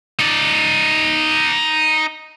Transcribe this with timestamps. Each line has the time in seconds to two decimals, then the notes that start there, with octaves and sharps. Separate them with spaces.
0.19 D#4 D5